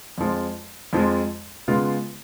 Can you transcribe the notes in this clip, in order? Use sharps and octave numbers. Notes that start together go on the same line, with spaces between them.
F2 F3 G#3
F2 F3 G#3
C#3 G#3 B3 F4